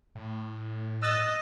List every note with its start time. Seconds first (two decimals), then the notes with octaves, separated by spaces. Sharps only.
0.15 A2
1.02 D#5 E6 F#6 A6